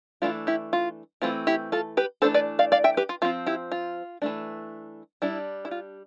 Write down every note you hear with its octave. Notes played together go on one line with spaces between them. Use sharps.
E3 A3 D4 F4
E4 G4
F4
E3 A3 C4 F4
E4 G4
F4 A4
G4 B4
E3 A3 D4 A4 C5
B4 D5
D5 F5
D5 F5
E5 G5
G4 B4
F4
F3 C4 F4
E4 G4
F4
E3 A3 D4
G3 D4 E4
E4
F4